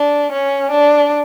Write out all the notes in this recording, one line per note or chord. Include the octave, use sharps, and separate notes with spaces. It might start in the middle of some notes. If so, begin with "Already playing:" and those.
Already playing: D4
C#4
D4